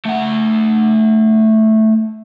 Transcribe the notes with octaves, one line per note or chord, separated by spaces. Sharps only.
A3 F#5